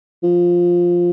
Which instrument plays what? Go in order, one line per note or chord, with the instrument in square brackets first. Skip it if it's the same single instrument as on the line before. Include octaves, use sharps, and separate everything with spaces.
[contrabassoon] F3